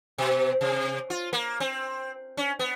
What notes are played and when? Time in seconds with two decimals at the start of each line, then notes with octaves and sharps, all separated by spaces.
0.18 B2
0.61 C3
1.10 F4
1.33 A#3
1.60 C4
2.37 C#4
2.59 B3